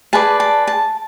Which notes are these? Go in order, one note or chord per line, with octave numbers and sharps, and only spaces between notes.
G#4 B4 D5 A5
A5
A5